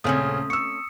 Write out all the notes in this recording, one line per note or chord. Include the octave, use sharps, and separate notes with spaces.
D#1 C#3 A3 C4 C#4 G#5 D#6
C#6 E6 C#7